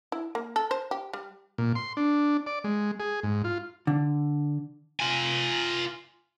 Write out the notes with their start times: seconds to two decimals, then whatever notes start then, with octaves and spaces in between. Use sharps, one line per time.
0.12 E4
0.35 A#3
0.56 A4
0.71 C5
0.91 G4
1.13 G3
1.58 A#2
1.75 C6
1.97 D4
2.46 D5
2.64 G#3
3.00 G#4
3.23 G#2
3.44 F4
3.87 D3
5.00 F4 G#5